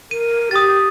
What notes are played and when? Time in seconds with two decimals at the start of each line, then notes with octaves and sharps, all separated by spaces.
0.11 A#4 D#7
0.51 G4 D#6 A6